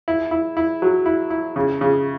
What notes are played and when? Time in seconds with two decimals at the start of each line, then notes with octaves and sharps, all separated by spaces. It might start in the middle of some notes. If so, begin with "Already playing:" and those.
0.08 E4
0.31 E4
0.57 E4
0.82 F#3
1.06 E4
1.30 E4
1.56 C#3
1.81 C#3